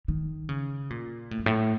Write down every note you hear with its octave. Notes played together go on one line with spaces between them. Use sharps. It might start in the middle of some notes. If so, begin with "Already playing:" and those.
D#3
C#3
A#2
A2
F#2
A2